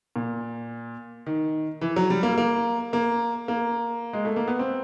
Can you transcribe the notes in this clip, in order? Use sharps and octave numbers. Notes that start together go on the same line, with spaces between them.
A#2
D#3
E3
F#3
G3
A#3
A#3
A#3
A#3
G#3
A3
A#3
B3
C4